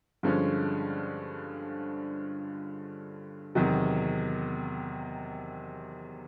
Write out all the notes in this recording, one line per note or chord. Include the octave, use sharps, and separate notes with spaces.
G2 D3 F3 G#3 C#4
E2 C3 D#3 F#3